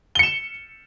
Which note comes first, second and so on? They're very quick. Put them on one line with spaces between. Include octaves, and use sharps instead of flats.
G7 C#7 E7